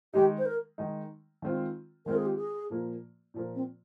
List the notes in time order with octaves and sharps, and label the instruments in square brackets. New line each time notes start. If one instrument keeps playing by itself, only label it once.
[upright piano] D#3 G#3 D#4 [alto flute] G4
[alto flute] C5
A#4
[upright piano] D#3 G#3 D#4
D#3 G#3 C4 F4
[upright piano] D#3 G#3 C4 F4 [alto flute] A#4
[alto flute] G#4
G4
G#4
[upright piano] A#2 F3 A#3
A#2 F3 A#3
[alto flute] C4